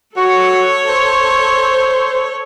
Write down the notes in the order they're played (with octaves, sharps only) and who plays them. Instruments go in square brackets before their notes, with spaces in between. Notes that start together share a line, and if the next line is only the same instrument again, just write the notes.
[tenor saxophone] F#4 [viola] A4 C#5
[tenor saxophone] C5